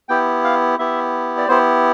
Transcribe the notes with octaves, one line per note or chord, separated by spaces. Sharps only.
B3 E4 G4 G5
F5
B3 E4 G4 E5
D5
B3 E4 G4 C5